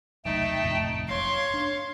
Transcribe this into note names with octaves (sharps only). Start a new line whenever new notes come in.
E1 C2 F#3 A3 D#4 G5 A5
A1 F2 C3
F#1 C#5 F5 C6
D4